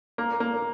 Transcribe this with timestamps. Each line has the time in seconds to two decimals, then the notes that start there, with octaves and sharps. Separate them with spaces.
0.18 A#3
0.40 A#3